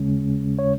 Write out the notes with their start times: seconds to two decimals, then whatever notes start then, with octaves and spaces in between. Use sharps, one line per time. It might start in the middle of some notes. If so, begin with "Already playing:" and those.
Already playing: D#2 C#3 G#3 C#4
0.59 C#5